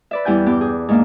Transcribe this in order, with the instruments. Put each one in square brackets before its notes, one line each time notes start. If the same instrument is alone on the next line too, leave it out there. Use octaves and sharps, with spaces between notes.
[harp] B4 D5 E5
E2 G3 E4 G5 G#5 G6
G2 B3 D6 G6
G#4
G#2 A#3 D4